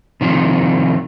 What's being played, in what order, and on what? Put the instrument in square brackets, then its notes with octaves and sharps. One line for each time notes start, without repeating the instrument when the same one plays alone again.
[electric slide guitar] C3 D#3 F3